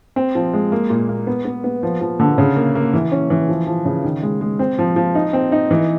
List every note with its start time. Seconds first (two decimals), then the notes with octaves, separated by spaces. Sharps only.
0.16 C4
0.35 F3
0.54 G#3
0.72 A#3
0.90 A#2
1.09 A#3
1.27 B3
1.45 B3
1.64 B3
1.83 F3
2.01 F3
2.20 D3
2.38 C#3
2.56 A#3
2.75 A#3
2.94 E3
3.12 C#4
3.30 E3
3.49 F3
3.67 F3
3.85 C#3
4.04 D#3
4.23 G#3
4.41 G#3
4.59 C4
4.79 F3
4.96 F3
5.15 D#4
5.33 C4
5.52 D#4
5.71 E3